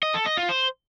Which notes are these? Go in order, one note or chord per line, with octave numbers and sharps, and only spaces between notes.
D#5
A4
D#5
F4
C5